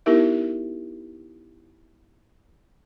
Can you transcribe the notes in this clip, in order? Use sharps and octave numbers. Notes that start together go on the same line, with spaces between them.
B3 D#4 E4 G4 A#4 E5